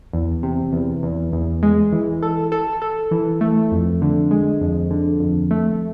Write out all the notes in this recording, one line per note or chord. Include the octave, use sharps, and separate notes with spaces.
E2
C3
E2
E2
E2
G#3
E3
A4
A4
A4
E3
A3
F2
D3
G#3
F2
D3
F2
A3